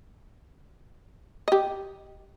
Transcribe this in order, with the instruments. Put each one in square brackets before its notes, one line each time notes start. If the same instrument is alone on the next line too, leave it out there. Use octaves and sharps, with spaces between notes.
[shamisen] G4 D#5